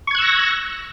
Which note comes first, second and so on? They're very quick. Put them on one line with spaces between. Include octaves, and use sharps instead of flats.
C#6 G#6 F#6 E6 A#6